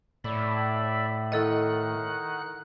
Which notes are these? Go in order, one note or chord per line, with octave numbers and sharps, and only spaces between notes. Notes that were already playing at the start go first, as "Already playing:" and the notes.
A2 D5 E5 B5
D#3 E4 A4 D#5 F#5 F#6